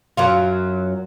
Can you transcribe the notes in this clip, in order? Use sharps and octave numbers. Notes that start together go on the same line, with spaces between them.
F#2 F#3 F4